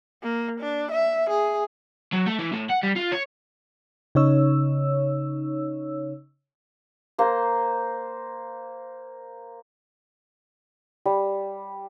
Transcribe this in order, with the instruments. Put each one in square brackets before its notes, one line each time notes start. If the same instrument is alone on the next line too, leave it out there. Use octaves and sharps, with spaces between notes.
[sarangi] A#3
D4
E5
G#4
[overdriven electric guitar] F#3
A3
E3
A2
F#5
G3
F4
C#5
[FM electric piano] C#3 D#4 C#5 E6
[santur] A#3 C5
G3